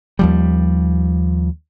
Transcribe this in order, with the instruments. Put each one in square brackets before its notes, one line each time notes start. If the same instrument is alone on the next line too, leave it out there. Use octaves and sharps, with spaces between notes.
[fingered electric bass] D#2 F3 G3